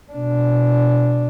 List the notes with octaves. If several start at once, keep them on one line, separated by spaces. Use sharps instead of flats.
B2 D4